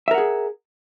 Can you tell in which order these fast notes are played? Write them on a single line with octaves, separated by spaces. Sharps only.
E5 A#4 F#5 G#4